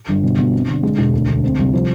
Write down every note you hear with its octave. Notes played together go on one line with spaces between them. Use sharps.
G1
B2
B2
C4
D3
G#3
E1
D2
D2
C4
C2
F3